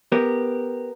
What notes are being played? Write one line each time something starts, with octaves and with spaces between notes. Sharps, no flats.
B3 G4 A#4